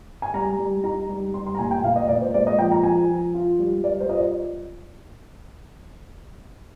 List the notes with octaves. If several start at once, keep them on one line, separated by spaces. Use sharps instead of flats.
G#5
G3 A#5
G3
D#4 A#5
G3
G3 C6
C6
A#5
A#2 G#5
G5
A#2 F5
D#5
A#2 D5
C5
G#3 D5
D#5
F3 G5
A#5
F3 G#5
F3
F4
G3
G3 D5
C5
F4 D#5
D5